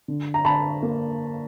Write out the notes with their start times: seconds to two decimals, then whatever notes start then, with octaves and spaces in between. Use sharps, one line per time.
0.08 D3
0.34 A#5
0.45 D3 A5 B5
0.83 A#3